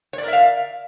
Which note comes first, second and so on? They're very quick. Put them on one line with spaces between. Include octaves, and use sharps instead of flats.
C#5 D5 A#4 E5 F5